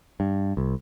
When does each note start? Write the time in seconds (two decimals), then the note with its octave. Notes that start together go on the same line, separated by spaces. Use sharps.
0.20 G2
0.57 C2